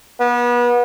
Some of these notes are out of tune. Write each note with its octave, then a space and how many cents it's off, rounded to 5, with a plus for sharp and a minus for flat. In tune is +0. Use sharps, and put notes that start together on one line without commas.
B3 -30